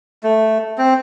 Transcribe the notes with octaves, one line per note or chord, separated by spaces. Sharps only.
A3
C4